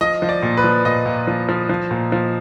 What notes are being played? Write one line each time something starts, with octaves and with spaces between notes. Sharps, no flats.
F3 D#5
F3
D5
A#2
B4
F3
A#2 D#5
A#2
F3
F3
F3
A#2
F3